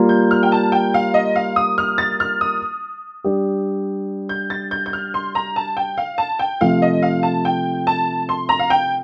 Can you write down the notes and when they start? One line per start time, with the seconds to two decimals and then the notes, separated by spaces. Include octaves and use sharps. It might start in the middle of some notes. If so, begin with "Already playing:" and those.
Already playing: G3 A#3 F4
0.09 G6
0.31 F6
0.43 G5
0.52 A5
0.72 G5
0.94 F5
1.14 D#5
1.36 F5
1.56 D#6
1.78 F6
1.98 A6
2.20 F6
2.41 D#6
3.24 G3 D4 G4
4.29 G6
4.50 A6
4.71 G6
4.86 G6
4.93 F6
5.14 C6
5.35 A#5
5.56 A5
5.77 G5
5.98 F5
6.18 A5
6.39 G5
6.61 C3 F3 A3 F5
6.82 D#5
7.03 F5
7.23 A5
7.45 G5
7.87 A5
8.29 C6
8.49 A#5
8.59 F5
8.70 G5